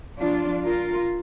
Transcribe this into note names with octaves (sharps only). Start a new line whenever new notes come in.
F3 D4 F4
F4 A#4